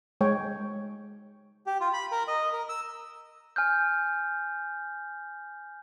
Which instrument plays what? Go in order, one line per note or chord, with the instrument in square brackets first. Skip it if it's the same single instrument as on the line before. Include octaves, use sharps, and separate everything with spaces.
[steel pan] G#3 C#5 G5
[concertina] G4
F4
B5
A#4
D#5
A#4
E6
[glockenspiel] G#5 F6 G6